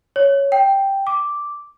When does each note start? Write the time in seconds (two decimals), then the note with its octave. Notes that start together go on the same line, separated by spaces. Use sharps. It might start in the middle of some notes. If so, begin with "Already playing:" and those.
0.16 C#5
0.52 G5
1.07 D6